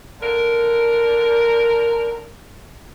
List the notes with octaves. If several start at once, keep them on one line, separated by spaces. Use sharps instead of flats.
D3 A#4